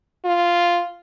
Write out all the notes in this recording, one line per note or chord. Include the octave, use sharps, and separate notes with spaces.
F4